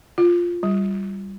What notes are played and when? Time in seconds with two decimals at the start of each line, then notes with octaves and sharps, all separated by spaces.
0.18 F4
0.63 G3